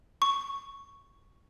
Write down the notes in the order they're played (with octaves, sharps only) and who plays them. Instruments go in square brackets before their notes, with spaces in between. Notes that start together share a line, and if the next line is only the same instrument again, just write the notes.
[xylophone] C#6